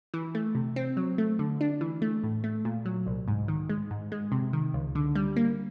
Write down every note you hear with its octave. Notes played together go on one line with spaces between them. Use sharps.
E3
A3
C3
C4
F#3
A3
D3
D4
E3
A3
A2
A3
A#2
F#3
C2
G#2
D#3
G#3
G#2
G#3
C3
D#3
C#2
D3
G3
A#3